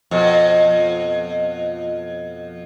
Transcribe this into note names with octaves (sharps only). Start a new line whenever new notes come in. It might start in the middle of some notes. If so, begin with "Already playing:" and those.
F2 B2